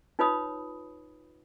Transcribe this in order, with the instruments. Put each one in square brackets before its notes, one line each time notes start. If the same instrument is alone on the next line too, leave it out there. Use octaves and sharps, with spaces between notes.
[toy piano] D#4 F4 B4 C#5 B5 D#6